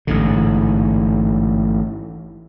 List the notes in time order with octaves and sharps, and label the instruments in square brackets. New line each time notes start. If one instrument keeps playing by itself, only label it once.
[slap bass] A1 G#2 D3